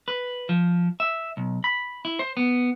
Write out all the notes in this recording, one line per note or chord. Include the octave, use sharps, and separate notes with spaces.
B4
F3
E5
B1
B5
E4
C5
B3